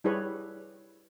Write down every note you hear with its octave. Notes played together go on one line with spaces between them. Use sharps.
G3 E4 G4 G#4 B4 C#5